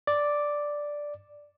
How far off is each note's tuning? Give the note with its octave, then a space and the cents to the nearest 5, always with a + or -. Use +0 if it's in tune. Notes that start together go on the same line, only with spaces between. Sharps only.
D5 +0 D6 +0